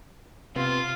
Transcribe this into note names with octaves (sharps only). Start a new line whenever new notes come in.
C3 B3 C4 F4